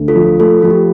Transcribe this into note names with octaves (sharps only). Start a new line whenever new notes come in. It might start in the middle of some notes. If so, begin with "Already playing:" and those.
Already playing: D2
F4 A4
F3
A3 F4 A4
F3 F4
G4